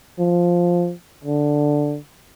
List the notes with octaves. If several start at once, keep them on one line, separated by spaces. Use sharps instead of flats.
F3
D3